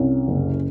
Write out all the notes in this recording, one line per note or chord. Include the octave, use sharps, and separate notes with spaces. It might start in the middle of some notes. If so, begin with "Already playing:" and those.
Already playing: C2 C#4
F#1